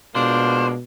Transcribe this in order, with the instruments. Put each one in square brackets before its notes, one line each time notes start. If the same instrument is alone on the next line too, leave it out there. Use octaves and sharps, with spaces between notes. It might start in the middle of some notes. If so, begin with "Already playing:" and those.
[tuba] B2 [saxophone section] G#3 A#3 F4 [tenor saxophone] D4 [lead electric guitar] C5